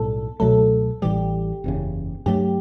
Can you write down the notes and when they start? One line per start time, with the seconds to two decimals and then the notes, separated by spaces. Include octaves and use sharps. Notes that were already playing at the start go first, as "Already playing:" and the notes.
Already playing: B1 A2 G3 B3 A4
0.40 C#2 B2 F#3 A3 A4
1.02 A1 A2 E3 G3 G4
1.64 F#1 E2 C#3
2.26 G2 F#3 A3 G4